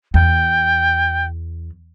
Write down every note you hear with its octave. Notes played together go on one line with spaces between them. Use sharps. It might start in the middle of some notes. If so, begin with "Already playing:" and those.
E2 G5